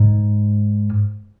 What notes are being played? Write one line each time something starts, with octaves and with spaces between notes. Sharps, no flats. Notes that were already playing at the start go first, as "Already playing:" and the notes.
Already playing: G#2